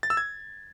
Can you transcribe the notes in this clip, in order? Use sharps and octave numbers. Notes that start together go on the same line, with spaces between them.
A6
E6
G#6